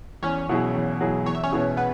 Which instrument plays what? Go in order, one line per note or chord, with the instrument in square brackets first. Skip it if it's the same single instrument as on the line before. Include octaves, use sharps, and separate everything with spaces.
[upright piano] E2 [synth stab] C#4 C#5
[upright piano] B2 F#3 E4 G#4
E2
B2 F#3 E4 G#4
[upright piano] E2 [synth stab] C#5
[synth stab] E5
C#4 C#5
[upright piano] B2 B3 E4 G#4
[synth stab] B3 B4